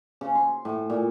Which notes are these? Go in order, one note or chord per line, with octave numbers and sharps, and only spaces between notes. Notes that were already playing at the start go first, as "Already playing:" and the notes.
C#3
C6
A2
A#2